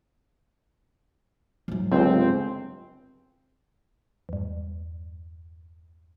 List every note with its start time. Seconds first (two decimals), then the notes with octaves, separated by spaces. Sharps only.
1.68 G#2 F#3
1.92 G1 C#2 C4
4.29 E2 G2